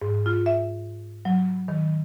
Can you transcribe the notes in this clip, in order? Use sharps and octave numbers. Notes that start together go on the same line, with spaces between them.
G#2
F4
E5
F#3
D#3